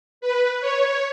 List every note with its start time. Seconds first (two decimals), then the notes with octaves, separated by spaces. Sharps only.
0.21 B4
0.61 C#5